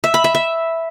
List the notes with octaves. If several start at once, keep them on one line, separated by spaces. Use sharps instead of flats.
E5
B5
E5
E5